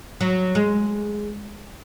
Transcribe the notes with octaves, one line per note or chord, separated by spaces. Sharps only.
F#3
G#3